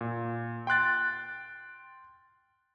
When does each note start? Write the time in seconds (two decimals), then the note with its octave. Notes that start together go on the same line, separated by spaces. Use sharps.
0.01 A#2
0.67 G5 C6 F#6 A6